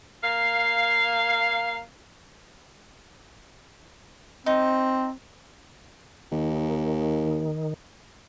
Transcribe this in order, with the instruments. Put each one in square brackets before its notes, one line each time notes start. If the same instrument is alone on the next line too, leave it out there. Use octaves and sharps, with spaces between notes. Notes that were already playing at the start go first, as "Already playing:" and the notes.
[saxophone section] A#3 F5
[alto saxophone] C4 [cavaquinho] D#4
[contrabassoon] D#2 [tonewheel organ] D#3